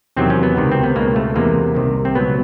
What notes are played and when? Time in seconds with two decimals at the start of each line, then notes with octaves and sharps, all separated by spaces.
0.16 E2 C3 D#3 F#3 C4
0.30 C#4
0.43 B3
0.56 C#2 C3 D#3
0.72 C4
0.84 B3
0.96 C#2 B2 G#3 A#3
1.16 A3
1.36 E2 C3 E3 G#3 A#3
1.75 C2 C3 D#3
2.05 C4
2.15 C#2 B2 F#3 B3